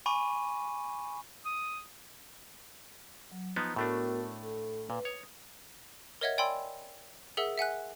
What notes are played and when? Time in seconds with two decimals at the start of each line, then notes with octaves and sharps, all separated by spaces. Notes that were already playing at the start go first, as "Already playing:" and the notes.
0.06 G#5 B5 C#6 D6 D#7
1.45 D#6
3.32 F#3
3.56 F3 B3 D#4 A#5
3.76 A2 A3 B3 D4 F#4 A#4
4.42 A4
4.90 A#2 B4
5.05 C#5 D#6
6.21 A#4 C#5 D#5 E5 F#5 G#6
6.38 D5 G5 G#5 B5 C6 E6
7.37 G#4 A#4 E5 F#5 E6
7.58 E5 F#5 G#5 F#6